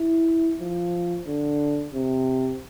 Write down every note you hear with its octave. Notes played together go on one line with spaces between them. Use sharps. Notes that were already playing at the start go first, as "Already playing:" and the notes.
Already playing: E4
F3
D3
C3